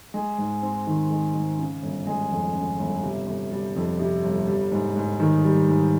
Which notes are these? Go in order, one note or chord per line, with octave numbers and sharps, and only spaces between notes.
G#3
G#2
C4
D#3
G#3
G#2
C#3
G1
G#3
F2
C#3
G1
C3
G1
G3
F2
C3
G1
G3
G#2
G#2
D#3
G3
G#2